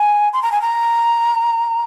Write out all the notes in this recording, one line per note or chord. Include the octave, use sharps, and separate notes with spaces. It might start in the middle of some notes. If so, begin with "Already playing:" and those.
Already playing: G#5
C6
A#5
G#5
A#5